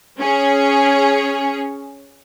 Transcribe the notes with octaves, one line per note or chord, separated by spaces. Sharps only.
C#4 G#4 C#5